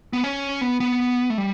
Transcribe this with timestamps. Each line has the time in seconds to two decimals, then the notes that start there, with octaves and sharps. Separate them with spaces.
0.13 B3
0.24 C#4
0.61 B3
0.80 B3
1.30 A3
1.38 G3